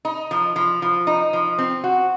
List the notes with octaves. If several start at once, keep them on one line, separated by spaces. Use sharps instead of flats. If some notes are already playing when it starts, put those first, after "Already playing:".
D#4
F3
F3
F3
D#4
F3
C4
F#4